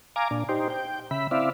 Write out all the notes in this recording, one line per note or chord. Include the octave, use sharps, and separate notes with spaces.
F5 G#5 A#5 D6
A#2 D4
D#4 G4 C5
G5
C#3 E5 B5
C4 E4 D5 E5 F5